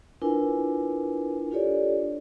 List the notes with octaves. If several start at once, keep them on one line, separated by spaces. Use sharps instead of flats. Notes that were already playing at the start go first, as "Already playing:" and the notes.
D4 E4 F4 A#4 B4 G#5
D4 F4 G4 A4 C#5 D5